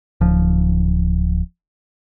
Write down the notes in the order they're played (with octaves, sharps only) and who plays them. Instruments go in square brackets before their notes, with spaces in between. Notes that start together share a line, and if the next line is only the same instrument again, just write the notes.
[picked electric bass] D1 F3